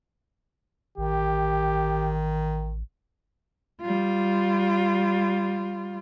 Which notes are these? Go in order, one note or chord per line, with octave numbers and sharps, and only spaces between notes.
A1 D#3 G4
G3 F4